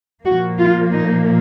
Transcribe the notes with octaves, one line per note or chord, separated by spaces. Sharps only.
A#2 F3 A#3 F#4
F4
D#4